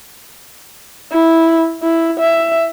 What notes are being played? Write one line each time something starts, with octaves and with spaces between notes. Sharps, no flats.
E4
E4
E5